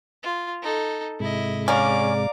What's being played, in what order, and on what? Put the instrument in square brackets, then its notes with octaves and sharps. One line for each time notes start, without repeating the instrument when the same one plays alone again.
[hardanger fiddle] F4
D#4 A4
[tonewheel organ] G#2 C3 G#3 [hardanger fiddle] E4 D#5
[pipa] C#4 [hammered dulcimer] D5 F5 A#5 [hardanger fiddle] D6